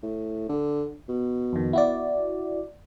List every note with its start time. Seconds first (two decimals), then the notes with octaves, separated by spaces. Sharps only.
0.03 A2
0.49 D3
1.09 B2
1.53 F2 D#3
1.73 E4 F#4 D5